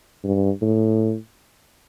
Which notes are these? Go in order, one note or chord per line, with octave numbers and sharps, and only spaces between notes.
G2
A2